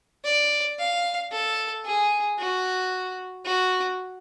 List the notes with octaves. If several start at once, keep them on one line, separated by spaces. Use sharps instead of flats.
D5
F5
A4
G#4
F#4
F#4